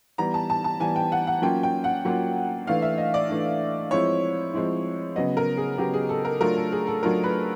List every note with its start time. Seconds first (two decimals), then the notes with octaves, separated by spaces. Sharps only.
0.18 E3 G3 B3 A#5
0.34 A5
0.50 A5
0.64 A5
0.80 E3 G3 B3 G#5
0.96 G5
1.12 F#5
1.27 F#5
1.42 F#3 A#3 C#4 F4 G5
1.63 G5
1.84 F#5
2.05 F#3 A#3 C#4 F4
2.67 E3 A3 D4 F5
2.82 E5
2.98 D#5
3.14 D5
3.29 E3 A3 D4
3.91 F3 G#3 C4 E4 C#5
4.53 F3 G#3 C4 E4
5.16 C#3 F#3 B3 D#5
5.37 A#4
5.57 G#4
5.78 C#3 F#3 B3 G4
5.93 G#4
6.09 A4
6.25 A#4
6.41 F#3 A3 D4 F4 A#4
6.56 A4
6.72 G#4
6.87 A4
7.03 F#3 A3 D4 F4 A#4
7.24 B4